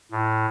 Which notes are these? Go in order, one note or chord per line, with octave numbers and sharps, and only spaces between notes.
A2